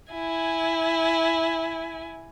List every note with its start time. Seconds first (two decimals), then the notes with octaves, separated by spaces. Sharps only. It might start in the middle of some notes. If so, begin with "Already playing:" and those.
0.13 E4 G#5